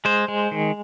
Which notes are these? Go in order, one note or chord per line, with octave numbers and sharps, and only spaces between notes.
G#3 C5
G#3
D#3